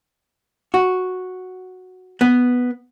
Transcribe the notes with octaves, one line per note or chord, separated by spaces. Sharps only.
F#4
B3